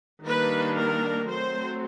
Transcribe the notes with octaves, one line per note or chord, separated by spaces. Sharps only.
D#3 G3 A#3 D4 B4
A#4
F#3 A3 C4 C5